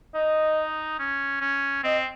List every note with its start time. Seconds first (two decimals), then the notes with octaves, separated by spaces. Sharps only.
0.15 D#4 D#5
0.99 C#4
1.41 C#4
1.84 C4 D#5